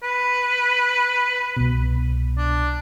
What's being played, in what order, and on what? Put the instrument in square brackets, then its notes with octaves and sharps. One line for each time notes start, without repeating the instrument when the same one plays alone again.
[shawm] B4
[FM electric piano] C2 B2
[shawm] D4